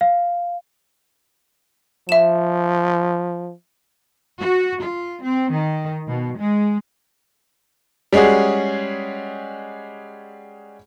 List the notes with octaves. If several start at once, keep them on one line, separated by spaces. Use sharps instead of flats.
F5
F3 E5 E7
F#4
F4
C4
D#3
B2
G#3
G3 G#3 C#4 F#4 G#4